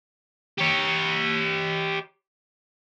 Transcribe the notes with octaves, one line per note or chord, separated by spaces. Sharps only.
G4 C#5